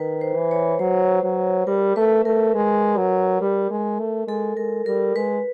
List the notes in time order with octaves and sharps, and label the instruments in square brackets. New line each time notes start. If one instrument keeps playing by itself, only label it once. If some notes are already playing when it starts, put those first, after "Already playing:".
Already playing: [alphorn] D#3 [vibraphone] B4
[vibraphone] C5
[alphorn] E3
[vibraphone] C#5
[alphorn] F#3 [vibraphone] C5
[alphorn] F#3
[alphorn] G3 [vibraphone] A#4
[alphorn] A3 [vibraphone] B4
[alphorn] A3 [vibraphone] A#4
[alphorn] G#3
F#3
G3
G#3
A3
[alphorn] G#3 [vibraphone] A4
[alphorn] G#3 [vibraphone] A#4
[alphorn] G3 [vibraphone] A#4
[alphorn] G#3 [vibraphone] B4